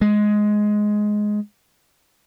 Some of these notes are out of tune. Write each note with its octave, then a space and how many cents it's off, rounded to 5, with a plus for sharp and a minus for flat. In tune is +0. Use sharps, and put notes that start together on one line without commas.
G#3 +10